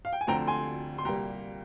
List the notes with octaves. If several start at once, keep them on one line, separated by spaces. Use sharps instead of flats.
F5
G5
G#5
D2 D3 F3 C4 G5 A#5
G#5 C6
C6
C2 A#2 G3 A#3 G5 A#5